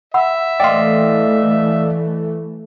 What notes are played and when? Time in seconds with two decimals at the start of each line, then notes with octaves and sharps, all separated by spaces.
0.14 E5 F#5 B5 E6
0.60 E3 A3 D5 D#5 F5 G5 C6